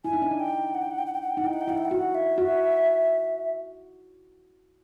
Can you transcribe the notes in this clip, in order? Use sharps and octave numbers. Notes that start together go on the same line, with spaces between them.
E4 G#5
D#4
D4
D#4
G5
F#5
G5
F#5
G5
F#5
G5
F#5
G5
D#4 F#5
E4 G5
F#5
G5
E4 F#5
G5
F#5
F#4
E5
F#4